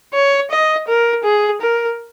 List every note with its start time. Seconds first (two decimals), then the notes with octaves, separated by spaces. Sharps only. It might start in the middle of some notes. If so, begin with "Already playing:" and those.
0.14 C#5
0.50 D#5
0.88 A#4
1.24 G#4
1.61 A#4